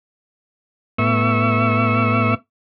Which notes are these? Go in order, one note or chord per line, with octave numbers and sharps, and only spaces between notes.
A2 B3 E5 C#6 E6